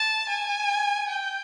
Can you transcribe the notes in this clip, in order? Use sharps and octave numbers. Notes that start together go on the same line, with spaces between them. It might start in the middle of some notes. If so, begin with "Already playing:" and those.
Already playing: A5
G#5
G5